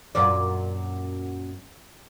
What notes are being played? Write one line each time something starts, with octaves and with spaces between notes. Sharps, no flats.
F#2 A#2 D5